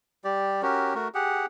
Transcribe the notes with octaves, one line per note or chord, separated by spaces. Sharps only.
G3 G4 D5
C#4 F#4 G4 A#4
A3 F#4 A#4
G4 G#4 F#5